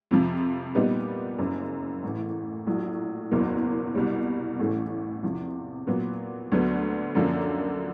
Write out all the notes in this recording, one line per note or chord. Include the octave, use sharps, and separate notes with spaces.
F2 C3 F3
A#2 G3 B3 D#4
F#1 F#2 C#3
A1 A2 E3
A#1 A2 F#3
F#1 E2 B2 F#3 A#3
C2 B2 G3
A1 A2 E3 A3 C#4
E2 C3 F3
A#2 F#3 B3
D2 D3 F#3 B3
F#2 D3 F3 A#3 C#4